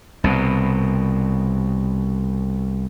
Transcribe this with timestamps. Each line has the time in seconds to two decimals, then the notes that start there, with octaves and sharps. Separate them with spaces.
0.24 C2 B2